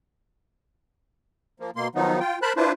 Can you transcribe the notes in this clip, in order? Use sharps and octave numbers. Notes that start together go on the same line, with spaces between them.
F3 A#3
B2 A#3 C6
D#3 F3 F#3 B3 D#4
F4 G5
A#4 C5 A5 B5 F#6
D4 E4 F4 B4 C5